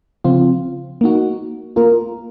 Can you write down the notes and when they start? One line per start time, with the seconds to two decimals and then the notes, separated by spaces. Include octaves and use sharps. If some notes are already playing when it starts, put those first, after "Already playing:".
0.24 C#3 F3 C4 F4
1.01 A#3 D#4 F#4
1.76 A#3 F4 A#4